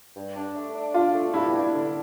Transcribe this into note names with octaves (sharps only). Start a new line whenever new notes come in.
G2
D4
A3
D4
D4 F4
A3
G2 E4
D4
D3